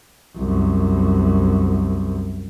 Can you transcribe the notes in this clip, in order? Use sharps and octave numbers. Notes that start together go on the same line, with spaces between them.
C2 F#2